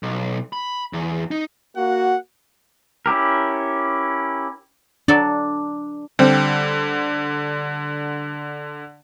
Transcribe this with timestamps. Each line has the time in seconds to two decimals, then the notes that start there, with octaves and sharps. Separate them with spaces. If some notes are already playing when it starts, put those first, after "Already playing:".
0.03 B1
0.53 B5
0.93 E2
1.31 D#4
1.77 A#3 F#4 F#5
3.06 C#4 E4 G4 A#4
5.08 F#3 D4 A4 D5
6.19 D3 G3 C4